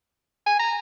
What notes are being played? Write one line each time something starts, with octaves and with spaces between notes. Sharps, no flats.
G#5
A#5